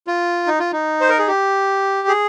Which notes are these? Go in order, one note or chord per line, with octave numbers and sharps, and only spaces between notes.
F4
D#4
F4
D#4
C5
A#4
G#4
G4
G#4